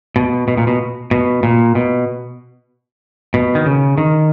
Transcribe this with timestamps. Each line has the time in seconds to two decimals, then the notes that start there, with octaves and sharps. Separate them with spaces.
0.16 B2
0.48 B2
0.57 A#2
0.67 B2
1.11 B2
1.43 A#2
1.75 B2
3.34 B2
3.55 D#3
3.66 C#3
3.98 D#3